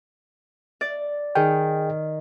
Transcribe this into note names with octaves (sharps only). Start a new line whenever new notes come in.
D5
D#3 G#4 G5